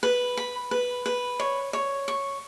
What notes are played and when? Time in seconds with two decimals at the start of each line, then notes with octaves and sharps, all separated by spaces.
0.03 B4
0.37 B5
0.71 B4
1.06 B4
1.40 C#5
1.73 C#5
2.08 C#6